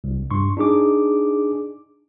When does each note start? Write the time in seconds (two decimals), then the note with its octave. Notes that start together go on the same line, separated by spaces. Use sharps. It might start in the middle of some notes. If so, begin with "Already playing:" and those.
0.04 C2
0.31 G2 C6 C#6
0.57 D4 D#4 G#4 D6